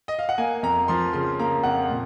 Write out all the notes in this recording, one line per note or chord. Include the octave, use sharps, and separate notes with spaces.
D#5
F5
F#5
A#3 G#5
F2 A#5
F3 C6
C#3 C6
A#3 A#5
F2 F#5
A#2